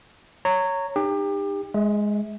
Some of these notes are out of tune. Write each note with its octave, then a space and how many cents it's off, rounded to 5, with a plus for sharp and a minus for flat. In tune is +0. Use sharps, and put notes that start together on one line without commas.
C#5 +0 A#5 -20
D#4 -30 G4 +30
G#3 +0 E5 -35